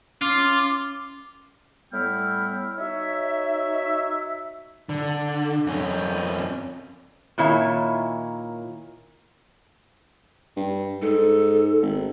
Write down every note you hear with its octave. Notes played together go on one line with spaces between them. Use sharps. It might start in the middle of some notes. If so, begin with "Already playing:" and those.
C#4 F4 D6
A2 G3 B3 E4 G5 F6
D#4 F#4 C#5 E5
D3
F2 C#4
A#2 D#3 E4 C#5 E5
G2
G#2 A4
G#1